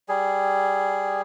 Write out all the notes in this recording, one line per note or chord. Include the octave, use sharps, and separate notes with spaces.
G3 G#4